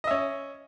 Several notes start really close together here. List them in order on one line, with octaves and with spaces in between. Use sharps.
D#5 E5 C#4